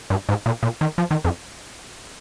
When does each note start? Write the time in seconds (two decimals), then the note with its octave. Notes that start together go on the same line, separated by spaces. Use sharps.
0.10 G2
0.29 G#2
0.46 A#2
0.63 A#2
0.81 D#3
0.98 F3
1.11 D#3
1.25 F2